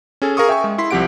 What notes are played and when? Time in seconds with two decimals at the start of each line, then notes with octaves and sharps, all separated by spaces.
0.22 C#4 G#4 A4 G#5
0.37 G#4 A#4 F5 C#6 D#6
0.49 E5 G5 G#5 C#6
0.64 G#3
0.78 E4 C6 B6
0.91 C2 F3 C4 G4 F#5 D7